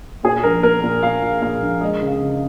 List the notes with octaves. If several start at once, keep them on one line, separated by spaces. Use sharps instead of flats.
A#2 G#4
A#1 A#4
A#2 A#4
A#2
A#2 F5
A#2
A#2 F5
A#1
G#3 D#5
C#2
F5
C#3